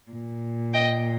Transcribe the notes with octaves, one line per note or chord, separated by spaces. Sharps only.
A#2
D#5 G5